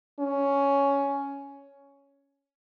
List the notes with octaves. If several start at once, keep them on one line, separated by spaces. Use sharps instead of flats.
C#4